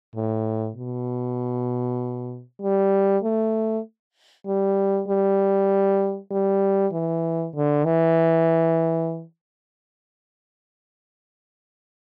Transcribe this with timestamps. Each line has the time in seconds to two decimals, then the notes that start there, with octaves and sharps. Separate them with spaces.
0.15 A2
0.76 B2
2.62 G3
3.23 A3
4.47 G3
5.08 G3
6.31 G3
6.92 E3
7.55 D3
7.85 E3